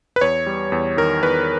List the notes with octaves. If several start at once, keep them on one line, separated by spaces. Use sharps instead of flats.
B4
E2 C#5
G3
E2
D#3 A#4
E2 B4